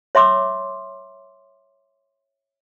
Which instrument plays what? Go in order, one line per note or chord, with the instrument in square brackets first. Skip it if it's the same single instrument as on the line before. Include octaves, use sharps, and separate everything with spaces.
[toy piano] C#5 E5 C6 D6 E6